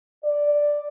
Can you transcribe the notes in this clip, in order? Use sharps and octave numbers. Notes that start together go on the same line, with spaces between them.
D5